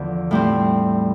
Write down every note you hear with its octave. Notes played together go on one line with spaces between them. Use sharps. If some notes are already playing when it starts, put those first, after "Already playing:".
Already playing: E2 D3 F3 E4
A2 G3 C4